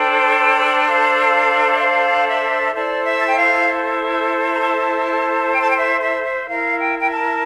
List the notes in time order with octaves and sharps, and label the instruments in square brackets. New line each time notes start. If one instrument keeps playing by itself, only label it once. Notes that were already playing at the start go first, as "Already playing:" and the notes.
Already playing: [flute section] D4 A4 C5 G5
F5
E5
F5
E5
E4 A4 C5 D5
E5
A5
G5
F5
A#5
A5
G5
A5
G5
E5
E5
E5
E4 A#4 F5
G5
G5
A5